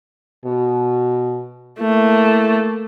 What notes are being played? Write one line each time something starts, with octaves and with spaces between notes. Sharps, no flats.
B2
A3 A#3 E4